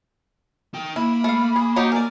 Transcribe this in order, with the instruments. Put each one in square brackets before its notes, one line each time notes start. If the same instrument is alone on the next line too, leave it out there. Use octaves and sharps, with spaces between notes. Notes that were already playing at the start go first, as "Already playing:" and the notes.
[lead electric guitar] D#4 G5
[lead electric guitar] A#3 [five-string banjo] E4 [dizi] B5
[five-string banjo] A3 F5
G#4
F#3 D#4 G4
[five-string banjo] A#4 D5 [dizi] G#5